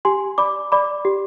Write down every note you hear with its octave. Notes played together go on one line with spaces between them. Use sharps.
G4 G#5 C6
D5 B5 D6
D5 B5 D6
G4